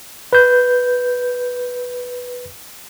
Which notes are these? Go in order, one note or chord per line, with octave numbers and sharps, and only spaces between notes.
B4 G6